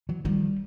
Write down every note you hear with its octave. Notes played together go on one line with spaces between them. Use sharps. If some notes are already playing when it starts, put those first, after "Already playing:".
E3 F#3
D#3 F3 G3